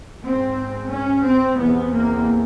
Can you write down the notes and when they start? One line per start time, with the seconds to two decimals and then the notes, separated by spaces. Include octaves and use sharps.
0.24 G#2 C4
0.90 C#4
1.24 C4
1.57 E2 C3 B3
1.91 A#3